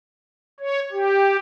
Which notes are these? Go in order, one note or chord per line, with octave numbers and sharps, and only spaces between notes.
C#5
G4